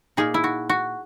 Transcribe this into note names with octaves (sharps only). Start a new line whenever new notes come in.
A#2 A#3 D#4 G#4
E4
F#4
F#4